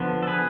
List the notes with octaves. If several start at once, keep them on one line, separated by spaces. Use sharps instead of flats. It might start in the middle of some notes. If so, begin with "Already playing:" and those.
Already playing: D3 F3 B3
A4
G#4 B4